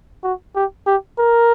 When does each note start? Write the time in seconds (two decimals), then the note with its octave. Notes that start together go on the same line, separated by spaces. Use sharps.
0.23 F#4
0.56 G4
0.86 G4
1.18 A#4